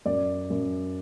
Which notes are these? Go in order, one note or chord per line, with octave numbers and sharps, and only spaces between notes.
F#2 D5
F#2